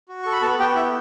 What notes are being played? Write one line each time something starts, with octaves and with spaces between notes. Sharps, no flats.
F#4
A4 C#6
B5
B3 A4 A5
B3 G4 G5
E4 E5